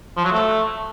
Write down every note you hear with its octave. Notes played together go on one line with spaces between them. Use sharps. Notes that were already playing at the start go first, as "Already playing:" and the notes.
F3
F#3
A3